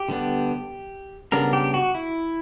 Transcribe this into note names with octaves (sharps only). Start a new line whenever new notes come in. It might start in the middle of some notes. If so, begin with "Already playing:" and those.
Already playing: G4
D3 G3 B3 D4
C#3 G3 B3 D4 A#4
G4
F#4
E4